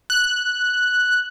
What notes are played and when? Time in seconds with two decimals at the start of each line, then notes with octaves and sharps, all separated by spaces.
0.10 F#6